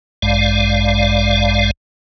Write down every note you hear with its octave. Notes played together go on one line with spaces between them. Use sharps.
A1 G2 G#3 D5 F5